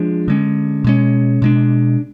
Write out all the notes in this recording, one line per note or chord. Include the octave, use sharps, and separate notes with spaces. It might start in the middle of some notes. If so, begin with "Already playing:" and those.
Already playing: F3 G#3 D4
D3 G#3 C#4
B2 G#3 C#4
B2 G#3 D4